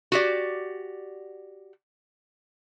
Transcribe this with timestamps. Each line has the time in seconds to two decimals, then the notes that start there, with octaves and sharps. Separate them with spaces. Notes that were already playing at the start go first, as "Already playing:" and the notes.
0.12 F#4 G4 D5